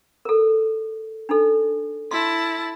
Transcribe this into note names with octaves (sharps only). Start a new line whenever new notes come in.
A4 A#4
D4 D#4 A4
E4 A5 C6